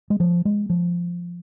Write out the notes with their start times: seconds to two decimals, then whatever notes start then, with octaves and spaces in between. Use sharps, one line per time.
0.10 G#3
0.20 F3
0.45 G#3
0.70 F3